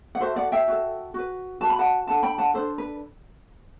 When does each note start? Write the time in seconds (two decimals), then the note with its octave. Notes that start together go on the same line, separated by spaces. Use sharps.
0.15 F#5
0.21 F#4 A4 C5 E5
0.36 D5 F#5
0.52 E5 G5
0.68 F#4 A4
1.14 F#4 B4
1.61 F#4 B4 A5
1.70 B5
1.79 F#5 A5
2.07 D4 A4 F#5 A5
2.23 G5 B5
2.38 F#5 A5
2.54 D4 A4 C5
2.78 B4